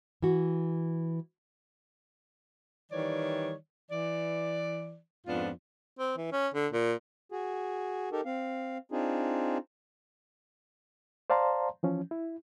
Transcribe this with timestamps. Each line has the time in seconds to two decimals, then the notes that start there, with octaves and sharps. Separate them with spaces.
0.22 E3 F#4
2.92 D#3 E3 G3 C#5 D5
3.91 E3 D5
5.27 F2 G#2 B3 D4 F4
5.99 C4
6.17 E3
6.32 C#4
6.54 D3
6.73 A#2
7.32 F#4 G#4
8.12 D#4 G4 A4 A#4
8.25 C4 F5
8.92 C4 D4 D#4 F4 G#4
11.30 C5 D5 F5 A5 A#5 C6
11.83 E3 F3 C#4
12.11 E4